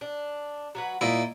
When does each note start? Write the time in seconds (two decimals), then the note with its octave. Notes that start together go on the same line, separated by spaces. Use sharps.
0.01 D4
0.75 F#3 F#4 B4
1.01 A#2 E4 D#5